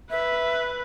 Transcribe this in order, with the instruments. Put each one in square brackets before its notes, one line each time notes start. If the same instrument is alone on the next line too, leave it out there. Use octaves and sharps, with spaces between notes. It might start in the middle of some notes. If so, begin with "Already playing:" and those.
[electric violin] B4 [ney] E5